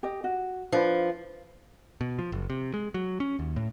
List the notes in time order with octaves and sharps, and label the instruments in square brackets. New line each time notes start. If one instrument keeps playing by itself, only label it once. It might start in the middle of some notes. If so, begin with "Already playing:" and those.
[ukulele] G4 D#5
F#4
[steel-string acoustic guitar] F3 [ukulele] D4 B4 C5
[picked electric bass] B2
F3
F#1
C3
G#3
F#3
C#4
D#2
A2